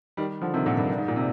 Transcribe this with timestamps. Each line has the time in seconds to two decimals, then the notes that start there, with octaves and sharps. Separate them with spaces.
0.17 D#3 G3
0.41 D3 F3
0.54 C3 D#3
0.66 A#2 D3
0.77 G2 A#2
0.90 G2
0.98 G#2
1.08 A#2
1.16 C3